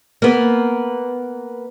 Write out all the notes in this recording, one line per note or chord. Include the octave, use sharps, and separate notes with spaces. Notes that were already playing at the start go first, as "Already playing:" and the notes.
A#3 B3